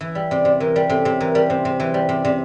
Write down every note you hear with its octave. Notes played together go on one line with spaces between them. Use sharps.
E3 E5
G3
C3 D5
C3
E3 A#4
G3
C3 A4
C3
E3 A#4
G3
C3 C5
C3
E3 C5
G3
C3 D5
C3